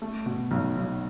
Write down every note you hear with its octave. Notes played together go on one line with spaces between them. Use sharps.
A3
B2
B1
B1